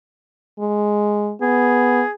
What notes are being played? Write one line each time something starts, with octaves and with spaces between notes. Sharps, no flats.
G#3
B3 G#4